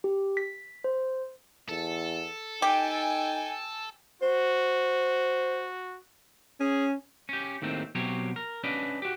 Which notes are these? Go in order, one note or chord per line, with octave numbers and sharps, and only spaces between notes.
G4
B6
C5
E2 A4
D#4 G4 G5 G#5
F#4 C5
C#4 G#4
C#4 G4
D#2 A2 D#3 C4
B2 F#3 C4 G4 C#5
A#4
C#4 D4 B4 D5 D#5
F#4 G4